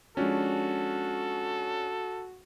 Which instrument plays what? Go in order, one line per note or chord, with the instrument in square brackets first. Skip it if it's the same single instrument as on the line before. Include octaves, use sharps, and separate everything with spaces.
[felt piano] F3 G#3 [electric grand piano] C#4 D4 [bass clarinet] F#4 [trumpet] A4